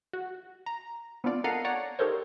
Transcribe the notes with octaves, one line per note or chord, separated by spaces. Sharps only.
F#4
A#5
B3 C4 D4 F4 D5
A4 A#4 D#5 F5 F#5
C#5 D5 F#5 A#5
D#4 G4 A4 A#4 C5 C#5